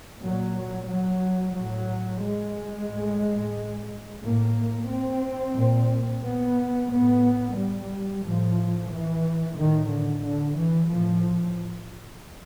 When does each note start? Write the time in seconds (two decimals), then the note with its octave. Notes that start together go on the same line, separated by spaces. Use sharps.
0.23 A#2 F#3
0.90 F#3
1.56 A2 F#3
2.24 G#3
2.91 A2
4.24 A2 A#3
4.90 C4
5.56 A#2
6.24 B3
6.91 A2 B3
7.56 G3
8.24 A2 F3
8.90 E3
9.57 A2 D#3
9.90 D3
10.24 D3
10.57 E3
10.90 A2 F3